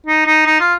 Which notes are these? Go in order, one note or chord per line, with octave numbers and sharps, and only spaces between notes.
D#4
D#4
D#4
F4